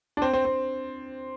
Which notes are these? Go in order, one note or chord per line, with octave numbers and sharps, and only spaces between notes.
D4
C4
C4
C4